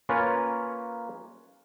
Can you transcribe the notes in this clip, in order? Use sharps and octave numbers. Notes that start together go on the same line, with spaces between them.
A#3 C#4 F4 A#4 B4 C#5